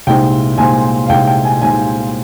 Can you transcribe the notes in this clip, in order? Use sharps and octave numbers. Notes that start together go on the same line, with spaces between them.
C2 A#2 G#3 C4 D#4 G5
C2 A#2 G#3 C4 D#4 G#5
F5
C2 A#2 G#3 C4 D#4 G5
G5
G#5
C2 A#2 G#3 C4 D#4 G#5